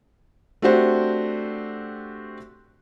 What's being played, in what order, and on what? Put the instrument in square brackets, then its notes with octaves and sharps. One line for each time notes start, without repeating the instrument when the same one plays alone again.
[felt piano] A3 C4 D4 F#4 G4 C5